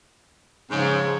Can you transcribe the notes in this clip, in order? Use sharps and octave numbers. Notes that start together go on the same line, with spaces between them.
G#2 C#3 F3 C#5